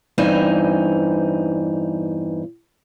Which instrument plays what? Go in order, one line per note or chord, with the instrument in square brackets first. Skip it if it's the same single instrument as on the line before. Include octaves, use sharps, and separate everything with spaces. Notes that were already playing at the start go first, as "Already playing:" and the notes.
[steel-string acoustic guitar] E2 G2 E3 C4 D#4 G#5